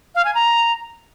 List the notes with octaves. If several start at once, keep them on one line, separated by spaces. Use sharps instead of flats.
F5
G#5
A#5